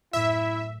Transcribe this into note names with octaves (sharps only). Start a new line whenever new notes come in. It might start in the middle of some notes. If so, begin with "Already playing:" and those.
F#2 A2 E4 E5